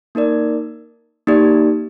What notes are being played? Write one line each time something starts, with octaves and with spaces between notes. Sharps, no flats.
A#3 D#4 A#4 D5
A#3 D#4 G4 D5